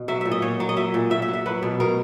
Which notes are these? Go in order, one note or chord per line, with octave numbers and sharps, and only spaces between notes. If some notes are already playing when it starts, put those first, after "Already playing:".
Already playing: B2
F#3 E5
A#2 E5
D#5
A#2 C#5
F#3
D#5
F#3 E5
A#2
A#2 E5
E5
F#3
E5
F#3 B4
B2
B2 A#4